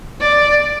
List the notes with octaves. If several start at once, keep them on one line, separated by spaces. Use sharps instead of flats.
D5